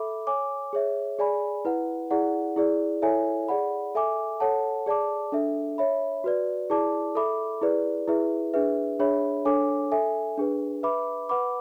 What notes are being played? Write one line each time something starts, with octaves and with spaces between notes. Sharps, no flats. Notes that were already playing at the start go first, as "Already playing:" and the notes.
Already playing: A4 E5 B5 D6
C#5 G#5 D6
G#4 C#5 E5
G#4 D5 G#5 B5
E4 B4 F#5
E4 G#4 D5 F#5
E4 G#4 D5
E4 A4 C#5 E5 G#5
G#4 D5 F#5 B5
A4 E5 G#5 D6
A4 C#5 F#5 A5
G#4 D5 A5 D6
D4 A4 E5
C#5 E5 B5
F#4 B4 D5
E4 G#4 D5 A5 D6
A4 E5 B5 D6
E4 G#4 B4 D5
E4 G#4 B4 E5
D4 G#4 B4 E5
D4 G#4 C#5 E5 B5
D4 A4 C#5 G#5 D6
A4 E5 G#5
D4 G#4 B4
B4 E5 B5 D6
B4 F#5 B5 D6